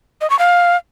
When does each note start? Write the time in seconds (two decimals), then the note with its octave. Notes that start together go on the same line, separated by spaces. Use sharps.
0.21 D#5
0.30 C#6
0.39 F5